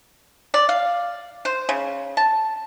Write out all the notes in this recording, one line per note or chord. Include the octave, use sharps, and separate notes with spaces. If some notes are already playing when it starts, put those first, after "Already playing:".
D5
F5
C5
C#3
A5